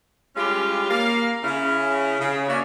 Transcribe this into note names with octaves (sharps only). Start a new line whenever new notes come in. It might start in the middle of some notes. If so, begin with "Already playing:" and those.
G3 G#3 C#4 E4 F4 G4
A#3 F5
C#3 C#4 E4
C#3
A#3 C#4 F#4 C#5 D5 E5